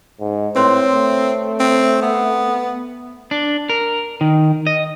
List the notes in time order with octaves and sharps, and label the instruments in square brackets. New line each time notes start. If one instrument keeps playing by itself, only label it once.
[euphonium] G#2
[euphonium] A2 [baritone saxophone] C4 [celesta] B4 C#5 C6
[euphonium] A3
[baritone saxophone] C4
B3
[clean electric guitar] D4
A#4
D#3
D#5